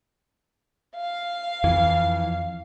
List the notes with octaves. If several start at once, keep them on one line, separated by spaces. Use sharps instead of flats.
F5
F2 E3